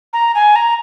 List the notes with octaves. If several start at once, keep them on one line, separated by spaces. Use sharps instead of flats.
A#5
G#5
A#5